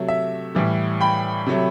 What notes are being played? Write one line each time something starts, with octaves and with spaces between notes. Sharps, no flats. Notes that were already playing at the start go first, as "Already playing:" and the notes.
Already playing: C3 F#3 A3
E5
A2 E3 G3
G5 B5
C3 F#3 A3